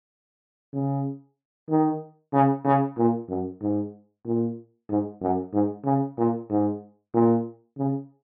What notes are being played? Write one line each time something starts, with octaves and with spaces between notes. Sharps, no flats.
C#3
D#3
C#3
C#3
A#2
F#2
G#2
A#2
G#2
F#2
G#2
C#3
A#2
G#2
A#2
C#3